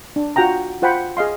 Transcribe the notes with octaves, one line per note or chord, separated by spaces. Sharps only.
D4
F4 F#4 F#5 G5 A#5
F4 C5 F#5 G5 B5
G#4 D#5 F5 C6